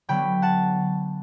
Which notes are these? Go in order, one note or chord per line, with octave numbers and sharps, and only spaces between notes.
D3 F#3 B3 G5 B5
F#5 A5